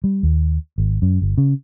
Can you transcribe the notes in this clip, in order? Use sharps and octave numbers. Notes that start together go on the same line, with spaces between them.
G3
D#2
G#1
F#2
G1
C#3